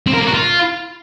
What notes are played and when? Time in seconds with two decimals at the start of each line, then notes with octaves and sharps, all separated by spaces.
0.07 C4
0.14 A#4
0.20 A#3
0.27 F#4
0.34 F4